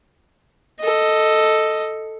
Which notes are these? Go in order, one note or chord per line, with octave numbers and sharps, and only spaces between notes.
A4 D#5